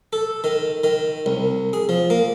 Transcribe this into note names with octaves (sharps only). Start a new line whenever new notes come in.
A4
D#3
D#3
C2
G#4
F3
A#3